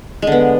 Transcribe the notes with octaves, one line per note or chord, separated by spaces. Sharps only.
D3 G#3 B3